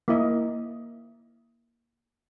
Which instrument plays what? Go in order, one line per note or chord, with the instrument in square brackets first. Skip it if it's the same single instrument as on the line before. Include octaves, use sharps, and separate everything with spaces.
[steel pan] A#3 E4 D#5